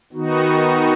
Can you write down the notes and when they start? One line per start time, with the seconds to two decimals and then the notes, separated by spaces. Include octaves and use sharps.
0.13 D#3 B3 D#4 F#4